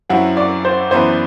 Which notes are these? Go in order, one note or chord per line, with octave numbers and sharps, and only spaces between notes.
F#2 F#3 C4 E4 F#5
D5
C5
F#2 E3 B3 E4 C5